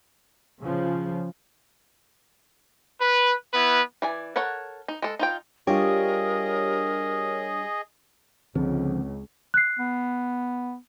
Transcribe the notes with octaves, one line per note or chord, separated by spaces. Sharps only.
C#3 F3
B4
B3 E4 B4
E3 D5 G#5
A4 A#4 C#5 F#5
D#4
G#3 A4
D#4 F4 G5
G3 D4 F4 G4 G#4 A#4 C#5 D#5
C#2 D3 F3 C4
F#6 C7
B3